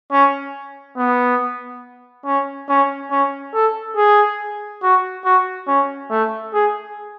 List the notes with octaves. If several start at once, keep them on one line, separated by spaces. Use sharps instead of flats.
C#4
B3
C#4
C#4
C#4
A4
G#4
F#4
F#4
C#4
A3
G#4